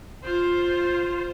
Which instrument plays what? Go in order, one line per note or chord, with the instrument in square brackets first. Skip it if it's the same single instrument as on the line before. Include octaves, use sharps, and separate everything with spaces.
[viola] F4 C5